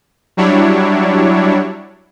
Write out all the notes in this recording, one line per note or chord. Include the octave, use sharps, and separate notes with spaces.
F#3 G3 D4 E4 C#5